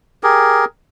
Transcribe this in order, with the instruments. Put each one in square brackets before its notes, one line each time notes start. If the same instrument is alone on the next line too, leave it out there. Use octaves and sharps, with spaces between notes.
[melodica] G4 G#4 A#4